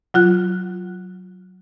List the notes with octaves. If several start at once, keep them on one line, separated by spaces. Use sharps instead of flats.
F#3 F4 F#6